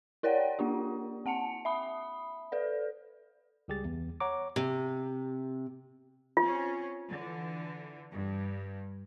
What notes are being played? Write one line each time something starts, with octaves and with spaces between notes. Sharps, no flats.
E4 A#4 C#5 D5 F#5 G5
A#3 D4 F4 G4
C4 F#5 A5 C#7
E5 B5 D#6
A4 B4 D5
C#2 G3 G4 G#4 A6
E2
C#5 F#5 A#5 C#6 D6
C3
C4 C#4 F4
D3 E3
G2